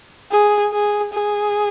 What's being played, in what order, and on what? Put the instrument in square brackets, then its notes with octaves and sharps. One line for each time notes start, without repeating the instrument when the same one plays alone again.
[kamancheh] G#4
G#4
G#4